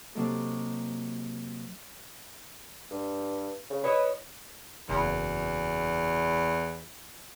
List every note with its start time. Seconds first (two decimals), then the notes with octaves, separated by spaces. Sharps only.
0.15 C3 F#3 A#3 C4 D#4 A4
2.91 G2
3.70 C#3
3.84 E4 B4 C#5 D#5
4.89 F#1 E2